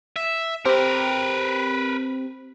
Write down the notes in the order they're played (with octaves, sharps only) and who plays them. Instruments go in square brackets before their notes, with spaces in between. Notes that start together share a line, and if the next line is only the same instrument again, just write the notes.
[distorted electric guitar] E5
[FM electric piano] C4 G4 [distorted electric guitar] A#4 B4